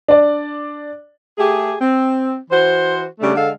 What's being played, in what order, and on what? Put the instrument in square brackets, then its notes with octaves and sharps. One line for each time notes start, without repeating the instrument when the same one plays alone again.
[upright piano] D4 D5
[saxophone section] A3 G4 G#4
C4
E3 F#4 C5
C#3 G3 A3 D4
D3 G#3 A4 F5